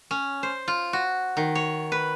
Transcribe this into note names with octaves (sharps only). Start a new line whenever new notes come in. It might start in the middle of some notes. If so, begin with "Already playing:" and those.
C#4
C5
F4
F#4
D#3
C#5
B4